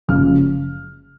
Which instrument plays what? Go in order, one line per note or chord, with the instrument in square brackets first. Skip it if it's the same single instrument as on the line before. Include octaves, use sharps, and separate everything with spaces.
[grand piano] F#1 F#2 C#3 F3 G#3 F6